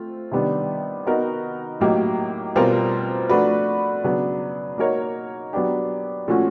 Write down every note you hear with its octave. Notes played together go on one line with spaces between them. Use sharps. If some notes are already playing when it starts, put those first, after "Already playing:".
Already playing: A3 C4 F4
C3 D#3 G3 B3 D4
B3 D#4 F#4 A#4
A2 F#3 A#3 D#4 G4
B2 G3 C4 F4 A#4
F3 A3 D4 F#4 B4
C#3 F#3 B3 D4
A#3 D#4 F#4 A#4 C#5
F#3 B3 D4 G4
A#2 F3 A3 C#4 F#4